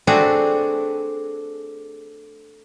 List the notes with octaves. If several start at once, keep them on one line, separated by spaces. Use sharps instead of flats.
A3 C4 D4 F#4 G#4